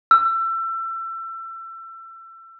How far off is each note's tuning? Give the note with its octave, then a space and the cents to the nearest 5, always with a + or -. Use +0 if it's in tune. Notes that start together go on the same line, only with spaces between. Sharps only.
E6 +30